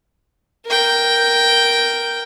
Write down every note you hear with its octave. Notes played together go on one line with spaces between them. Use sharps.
A#4 G5